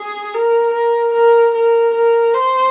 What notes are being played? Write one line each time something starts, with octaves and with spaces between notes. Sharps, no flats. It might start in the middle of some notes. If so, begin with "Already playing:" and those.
Already playing: G#4
A#4
A#4
A#4
A#4
A#4
C5